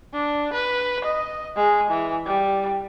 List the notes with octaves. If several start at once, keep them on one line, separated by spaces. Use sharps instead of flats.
D4
B4
D#5
G#3
E3
G3